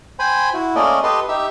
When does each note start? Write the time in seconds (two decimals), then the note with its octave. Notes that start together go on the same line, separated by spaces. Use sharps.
0.19 C5 G5 G#5 B5
0.54 E4 F#4
0.75 A3 A#3 C#4 A#4 D5 D#5
1.03 G4 A4 B4 D#5 C6
1.28 D#4 G4 E5